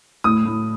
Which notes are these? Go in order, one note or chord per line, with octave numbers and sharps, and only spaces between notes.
A2 D#6
A2